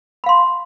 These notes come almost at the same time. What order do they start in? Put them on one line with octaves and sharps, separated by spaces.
B5 F5 C6